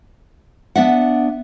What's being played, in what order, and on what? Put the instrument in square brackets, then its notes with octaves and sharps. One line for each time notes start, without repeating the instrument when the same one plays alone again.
[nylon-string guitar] B3 D4 E5 F#5